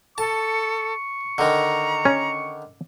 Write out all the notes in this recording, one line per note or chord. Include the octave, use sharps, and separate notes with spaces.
A4 A5 C#6
D3 D#3 A#5
C#4